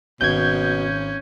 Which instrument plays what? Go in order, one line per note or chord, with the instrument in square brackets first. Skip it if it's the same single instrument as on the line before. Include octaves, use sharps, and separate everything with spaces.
[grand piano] G#1 [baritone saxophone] B2 [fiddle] C#4 [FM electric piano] G6 G#6